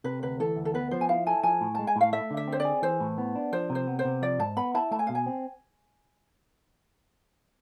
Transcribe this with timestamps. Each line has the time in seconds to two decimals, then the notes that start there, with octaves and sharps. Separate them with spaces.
0.04 C3 B4
0.22 D2 B4
0.40 E3 A4
0.56 D2
0.65 A4
0.74 B3 B4
0.91 F3 C5
1.01 G#5
1.09 E4 F5
1.27 A4 G#5
1.43 F3 G#5
1.61 A2
1.75 G#3 A5
1.87 G#5
1.96 A2 F5
2.13 A3 E5
2.31 D3
2.37 E5
2.48 C4 C5
2.60 D5
2.65 G#4
2.82 E3 C5
3.00 A2
3.18 B3
3.35 D4
3.53 F3 C5
3.70 C3
3.75 C5
3.87 B3
3.99 C5
4.05 C3
4.22 F3 D5
4.39 G#2 A5
4.57 B3 B5
4.74 E4 A5
4.91 A3 A5
4.99 G#5
5.07 B2 F5
5.15 G#5
5.26 C4